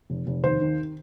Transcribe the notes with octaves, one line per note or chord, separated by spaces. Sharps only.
F1
F1
D#2 C5
D#3